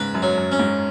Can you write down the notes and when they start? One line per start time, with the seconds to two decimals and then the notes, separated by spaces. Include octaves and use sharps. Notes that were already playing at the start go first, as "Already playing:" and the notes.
Already playing: G#2 C#3 B4
0.14 F#2
0.22 F#3
0.37 F#2
0.52 C#4
0.59 G#2